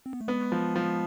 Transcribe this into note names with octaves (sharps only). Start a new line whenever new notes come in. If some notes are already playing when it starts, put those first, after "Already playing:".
C4
B3
A3
G#3 B3
F3
F3